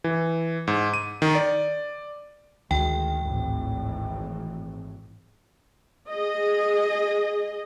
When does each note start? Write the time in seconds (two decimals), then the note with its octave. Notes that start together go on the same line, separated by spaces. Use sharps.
0.04 E3
0.67 G#2
0.94 D#7
1.22 D#3
1.35 D5
2.71 D2 D#3 G#3 G5
3.23 G#1 A2 E3
6.08 G#4 D#5